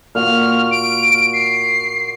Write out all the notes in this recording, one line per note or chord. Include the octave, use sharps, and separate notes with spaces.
A#2 F#4 F6
D7
C7